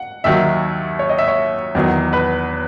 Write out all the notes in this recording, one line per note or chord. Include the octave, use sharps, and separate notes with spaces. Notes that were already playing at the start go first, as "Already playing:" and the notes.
Already playing: F#5
D#2 D#3 F#3 E5
C#5
D#5
E5
C#5
E2 D#3 F#3
B4